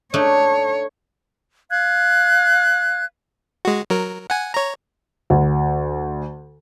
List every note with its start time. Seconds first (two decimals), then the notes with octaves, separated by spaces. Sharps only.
0.14 A3 D4 D#4 C#5
1.70 F5 F#6 G#6
3.65 G#3 F#4
3.90 F#3 A#4
4.30 F#5 G#5
4.54 C#5 A#5
5.30 D2